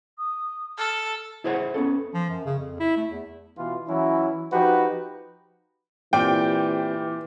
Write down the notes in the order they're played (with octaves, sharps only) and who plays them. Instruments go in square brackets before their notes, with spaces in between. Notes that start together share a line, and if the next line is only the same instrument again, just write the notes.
[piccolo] D#6
[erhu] A4 [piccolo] F6
[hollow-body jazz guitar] E4 G#4 C5 C#5 F#5
B3 C#4 A4
[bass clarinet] F3
F#2
C#3
F2
E4
A3
E2
[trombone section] B2 E3 F4
E3 F#3 C#4 E4
F3 D#4 F#4 G4 B4
[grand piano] A#2 [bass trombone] E3 [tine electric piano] C4 G4 [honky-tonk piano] G5